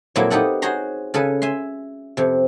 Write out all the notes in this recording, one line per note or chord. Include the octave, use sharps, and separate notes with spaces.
F2 A#2 F#3 A#3 E4
B3 D#4 G4 A4 F#5
F#4 G#4 C5 C#5 A#5 C6
C#3 A4 B4 G#5
E5 G#5 C6
F2 C3